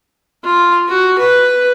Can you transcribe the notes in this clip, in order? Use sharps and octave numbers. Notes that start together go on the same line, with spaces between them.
F4
F#4
B4